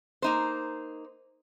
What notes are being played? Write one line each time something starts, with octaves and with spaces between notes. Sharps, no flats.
A#3 D#4 C5